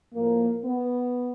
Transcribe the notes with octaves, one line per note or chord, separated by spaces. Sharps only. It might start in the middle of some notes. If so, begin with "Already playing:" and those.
A2 F3 A#3
B3